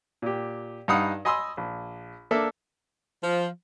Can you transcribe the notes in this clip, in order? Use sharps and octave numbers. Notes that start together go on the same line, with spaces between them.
A#2 G4
G2 D#4 F5 F#5 B5 D#6
D#5 G#5 B5 C6 D#6 E6
A#1
A#3 D4 A4 D5 E5
F3